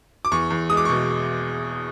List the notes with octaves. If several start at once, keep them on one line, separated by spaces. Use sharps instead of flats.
D6
E2 C#6
E2
G#3 D#6
D6
C#6
B2